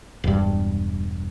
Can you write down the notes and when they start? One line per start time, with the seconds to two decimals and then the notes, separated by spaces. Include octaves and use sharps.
0.24 E1 G2